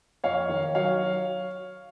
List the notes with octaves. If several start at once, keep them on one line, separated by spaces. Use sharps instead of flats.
F2 C#5 F5
D#3
F#3 C#5 F5